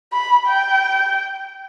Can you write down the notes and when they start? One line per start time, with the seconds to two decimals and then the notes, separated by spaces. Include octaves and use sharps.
0.13 B5
0.47 G5